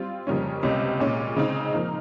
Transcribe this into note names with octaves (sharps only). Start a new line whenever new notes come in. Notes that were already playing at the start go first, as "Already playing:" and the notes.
Already playing: G3 C4 F4
F2 C#3 G3 A#3 C#4
C#2 C3 G3 C#4
A#2 G#3 C#4
C#3 G#3 C4 D#4
F3 A#3 D#4